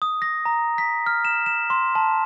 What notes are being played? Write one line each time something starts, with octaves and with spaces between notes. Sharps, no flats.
D#6
A#6
A#5
B6
F6
E7
E7
C6
A5